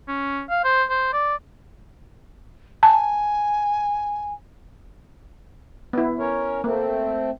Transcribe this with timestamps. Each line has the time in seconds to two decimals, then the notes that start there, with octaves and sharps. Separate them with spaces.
0.08 C#4
0.50 F5
0.64 C5
0.90 C5
1.13 D5
2.83 G#5 A5
5.93 B3 E4
6.19 C#4 A#4 C#5
6.64 A3 A#3 C4